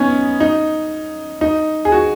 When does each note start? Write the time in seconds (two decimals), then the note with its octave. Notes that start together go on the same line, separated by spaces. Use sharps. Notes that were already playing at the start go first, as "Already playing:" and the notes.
Already playing: B3 C#4 D#4
0.40 D#4
1.41 D#4
1.85 G#4
1.92 F#4